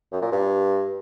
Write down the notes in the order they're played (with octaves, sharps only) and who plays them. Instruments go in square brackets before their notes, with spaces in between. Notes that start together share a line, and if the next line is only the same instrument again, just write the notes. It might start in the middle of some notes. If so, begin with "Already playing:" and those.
[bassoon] F#2
A#2
G2